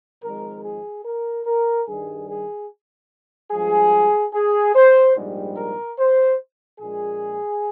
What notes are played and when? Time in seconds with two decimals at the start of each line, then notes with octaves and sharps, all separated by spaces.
0.23 G#1 G#2 F3 G#3 A#4
0.64 G#4
1.05 A#4
1.46 A#4
1.87 G2 D#3 G3 G#4
2.29 G#4
3.51 G2 F3 G#3 G#4
4.34 G#4
4.75 C5
5.17 A#1 G#2 G3
5.57 A#4
5.99 C5
6.80 A#1 A#2 G#3 G#4